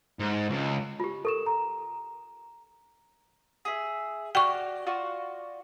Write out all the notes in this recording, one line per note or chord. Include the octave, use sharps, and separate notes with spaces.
G#2
C#2
F4 G4
A4 A#4 C#6 E7
A#5
G#4 E5
F#4 D5 G5 C#6 F6
F4 F#4 D5